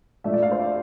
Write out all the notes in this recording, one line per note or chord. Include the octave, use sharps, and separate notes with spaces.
A#2 A3 D4 E5
D5
F5
C5
D5